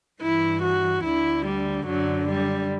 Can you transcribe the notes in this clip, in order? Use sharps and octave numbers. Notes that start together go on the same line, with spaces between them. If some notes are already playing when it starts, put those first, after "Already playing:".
G2 E3 E4
F#4
D2 D3 E4
G3
F#2 D3 F#3
G3